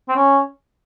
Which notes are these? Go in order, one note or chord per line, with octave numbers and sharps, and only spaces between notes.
C4
C#4